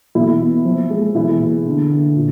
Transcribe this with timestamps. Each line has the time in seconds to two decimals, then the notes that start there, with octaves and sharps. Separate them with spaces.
0.15 B2 E3 E4
0.41 B3
0.65 F3
0.90 G#3
1.15 B2 E3 E4
1.40 B2
1.66 D3
1.90 D3
2.16 A#2